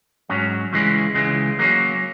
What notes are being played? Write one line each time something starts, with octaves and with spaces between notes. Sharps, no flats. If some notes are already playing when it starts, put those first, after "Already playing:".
G#2 F#3 C#4
C#2 C#3 E3 G#3
C#2 C#3 E3 G#3
F#3 A#3 C#4